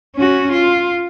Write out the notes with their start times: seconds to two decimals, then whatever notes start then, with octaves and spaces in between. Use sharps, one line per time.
0.16 C#4 F#4
0.53 F4